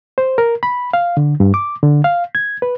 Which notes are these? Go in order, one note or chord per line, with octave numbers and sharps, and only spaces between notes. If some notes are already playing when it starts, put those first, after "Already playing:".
C5
A#4
B5
F5
D3
G2
D6
D3
F5
G#6
B4